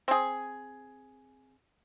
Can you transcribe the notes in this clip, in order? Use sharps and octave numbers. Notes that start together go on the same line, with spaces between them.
C4 G#4